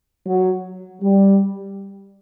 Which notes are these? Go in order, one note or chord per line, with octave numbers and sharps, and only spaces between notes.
F#3
G3